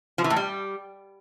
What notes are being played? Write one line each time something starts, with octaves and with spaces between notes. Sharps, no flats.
F3
E3
A2
G3